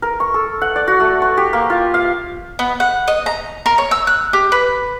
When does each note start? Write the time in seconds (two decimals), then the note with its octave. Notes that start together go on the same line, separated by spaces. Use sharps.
0.02 A#4
0.20 C#6
0.34 A4
0.61 F#5
0.76 D5
0.88 F#4
1.00 A3
1.22 C#6
1.37 G4
1.53 A#3
1.70 F4
1.94 F5
2.59 B3
2.80 F#5
3.08 D#5
3.26 A#5
3.66 A#4
3.78 C#5
3.91 E6
4.07 F#6
4.33 G4
4.52 B4